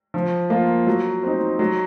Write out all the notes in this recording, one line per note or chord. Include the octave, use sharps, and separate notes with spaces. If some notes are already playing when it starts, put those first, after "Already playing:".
F3
A#3 F4
F#3
C4 D#4
F#3